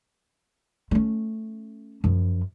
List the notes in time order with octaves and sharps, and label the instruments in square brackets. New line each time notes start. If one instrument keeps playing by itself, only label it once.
[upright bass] A3 C#4
F#2 F3